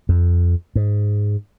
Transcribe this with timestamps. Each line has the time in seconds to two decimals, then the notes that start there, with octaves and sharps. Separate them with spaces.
0.09 F2
0.75 G#2